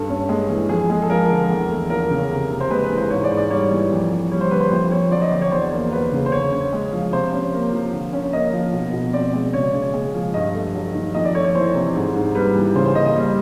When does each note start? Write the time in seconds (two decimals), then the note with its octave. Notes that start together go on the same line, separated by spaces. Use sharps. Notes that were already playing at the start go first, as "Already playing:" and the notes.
Already playing: G2 A4
0.09 C#4
0.29 G#3
0.49 E3
0.69 F2 G#4
0.90 G#3
1.02 A4
1.09 F3 A#4
1.30 D3
1.50 E2
1.70 A3
1.90 F3 A#4
2.10 C#3
2.30 C3
2.50 C3
2.60 C5
2.71 G#3 B4
2.84 B4
2.90 E3
2.97 C5
3.10 G#2 C#5
3.24 D5
3.31 G#2
3.37 D5
3.50 G3 C#5
3.71 E3
3.92 F2
4.11 F2
4.31 G3 C#5
4.41 C5
4.51 D3 B4
4.60 C5
4.71 F2 C5
4.91 F2 C#5
5.12 F#3 D5
5.22 D#5
5.31 D3 D5
5.42 C#5
5.52 E2 C5
5.72 A#3
5.92 F#3 B4
6.12 C#3
6.26 C5
6.32 D3 C#5
6.52 C#4
6.73 G#3
6.92 F3
7.13 C3 C5
7.33 C#4
7.53 A#3
7.72 F3
7.93 D3
8.13 C#4
8.33 A#3 D#5
8.53 F3
8.73 B2
8.93 B2
9.13 C4 D5
9.34 G#3
9.53 C#3 C#5
9.73 C#3
9.94 G#3
10.14 F3
10.34 G2 D#5
10.54 A3
10.75 F#3
10.94 D#3
11.14 F2 D#5
11.25 D5
11.34 A3 C#5
11.44 C#5
11.55 E3 C5
11.75 C3
11.95 G#2
12.15 G#2
12.35 G3 B4
12.56 E3
12.75 C#3 C5
12.86 C5
12.95 A#3 D#5
13.05 D#5
13.16 G3